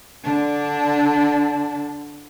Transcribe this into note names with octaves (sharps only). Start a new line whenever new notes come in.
D3 D4